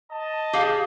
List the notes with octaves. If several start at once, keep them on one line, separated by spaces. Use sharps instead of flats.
D#5 A5
G4 G#4 F5